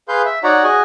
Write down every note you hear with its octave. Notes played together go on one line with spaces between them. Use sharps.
G#4 B4 F5 C6 G6
E5
D#4 F#4 C#5 D5 F#5 A#5
F#4 G#4 D#5 G#5